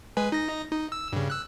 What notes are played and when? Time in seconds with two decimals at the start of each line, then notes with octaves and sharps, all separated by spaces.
0.17 G#3 B4 G#5
0.32 D#4 A#6
0.72 D#4
0.92 E6
1.13 G2 C#3
1.30 E6 F#6